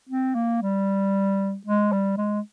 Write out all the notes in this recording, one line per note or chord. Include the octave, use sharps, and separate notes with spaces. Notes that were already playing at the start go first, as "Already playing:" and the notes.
C4
A#3
G3
G#3
G3
G#3